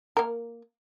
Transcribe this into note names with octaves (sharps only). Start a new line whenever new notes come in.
A#3 A#4